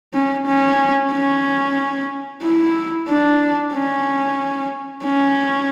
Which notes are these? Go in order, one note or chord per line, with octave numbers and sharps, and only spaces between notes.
C#4
C#4
C#4
E4
D4
C#4
C#4